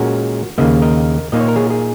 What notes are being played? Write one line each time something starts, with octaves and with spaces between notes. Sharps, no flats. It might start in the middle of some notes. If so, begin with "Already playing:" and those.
Already playing: A#2 G#3 C#4 F#4 A#4
D#2 C#3 A#3 D#5
A#4 D#5
A#2 A#3 D#4 D#5
C#5
A#4
G#4 C#5
G#4